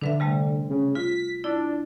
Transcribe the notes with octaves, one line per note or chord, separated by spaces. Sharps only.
D3 D4 B4 E5
C3 G3 A3
C#3
F4 B6
D4 E4